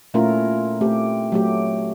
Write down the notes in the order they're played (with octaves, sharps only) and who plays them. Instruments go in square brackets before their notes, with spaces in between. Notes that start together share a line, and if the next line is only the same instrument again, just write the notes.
[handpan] A#2 A3 C#4 E4 F4 A#4
A3 C4 G4
F#3 A3 G4